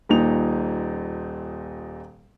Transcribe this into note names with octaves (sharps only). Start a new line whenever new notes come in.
D#1 A#2 D#4 F7